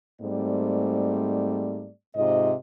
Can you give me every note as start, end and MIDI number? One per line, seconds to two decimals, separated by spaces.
0.21 1.89 44
0.21 1.89 55
0.21 1.89 57
0.21 1.89 60
0.21 1.89 74
2.15 2.54 44
2.15 2.54 48
2.15 2.54 65
2.15 2.54 75